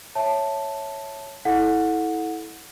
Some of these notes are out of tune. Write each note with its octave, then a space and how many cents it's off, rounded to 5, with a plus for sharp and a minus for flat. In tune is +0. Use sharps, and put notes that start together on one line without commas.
C#5 +0 E5 +0 A5 +0
E4 -25 A4 -20 F#5 -20